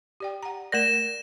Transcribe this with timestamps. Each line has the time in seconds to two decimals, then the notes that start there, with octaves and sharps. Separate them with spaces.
0.20 G4 D5 G5
0.43 F#5 A#5
0.72 A3 A#4 D5 A#6 E7